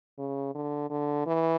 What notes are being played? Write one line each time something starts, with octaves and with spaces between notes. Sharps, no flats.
C#3
D3
D3
E3